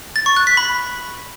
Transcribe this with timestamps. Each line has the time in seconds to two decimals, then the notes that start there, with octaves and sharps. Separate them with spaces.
0.16 A6
0.26 C#6
0.36 F#6
0.47 B6
0.57 B5